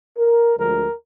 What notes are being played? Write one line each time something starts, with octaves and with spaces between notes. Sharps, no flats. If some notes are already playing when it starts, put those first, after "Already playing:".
A#4
D2 D3 F3 G#3 A#4